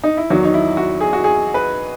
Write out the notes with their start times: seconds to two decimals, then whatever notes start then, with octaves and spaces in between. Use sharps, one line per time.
0.04 D#4
0.17 E4
0.30 E2 D#3 F#3 F#4
0.44 D#4
0.54 E4
0.77 F#4
1.01 G#4
1.13 F#4
1.24 G#4
1.54 B4